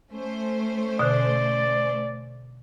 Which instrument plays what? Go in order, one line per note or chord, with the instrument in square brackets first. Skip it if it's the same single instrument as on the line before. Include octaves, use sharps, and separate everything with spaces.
[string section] A3 C#4 C5
[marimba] B2 D3 [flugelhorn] D5